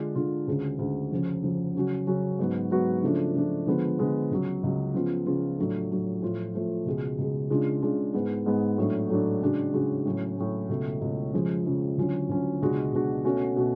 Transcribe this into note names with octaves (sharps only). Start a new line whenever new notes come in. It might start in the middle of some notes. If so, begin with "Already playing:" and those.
Already playing: D3 G#3 D4 F4
D3 G#3 D4 F4
D2 C#3 G#3
D2 C#3 G#3
F2 C#3 F3
F2 C#3 F3
C#3 F#3 C#4 F#4
C#3 F#3 C#4 F#4
G#2 F#3 B3 F#4
G#2 F#3 B3 F#4
C#3 F3 A3 D4
C#3 F3 A3 D4
D3 F3 G#3 B3
D3 F3 G#3 B3
C#2 C#3 F#3
C#2 C#3 F#3
C#3 F3 B3 F4
C#3 F3 B3 F4
A2 F#3 A3 D4
A2 F#3 A3 D4
A2 F3 A3 F4
A2 F3 A3 F4
C#2 B2 G#3
C#2 B2 G#3
C#3 G#3 D4 F4
C#3 G#3 D4 F4
G#2 G#3 B3
G#2 G#3 B3
A2 F#3 A3 D4
A2 F#3 A3 D4
C#3 G#3 D4 F#4
C#3 G#3 D4 F#4
A2 F#3 C#4
A2 F#3 C#4
C#2 B2 A3
C#2 B2 A3
F2 C#3 F3 G#3
F2 C#3 F3 G#3
D2 D3 F#3 C#4 F4
D2 D3 F#3 C#4 F4
C#2 B2 G#3 D4 F#4
C#2 B2 G#3 D4 F#4
B2 A3 C#4 F#4
B2 A3 C#4 F#4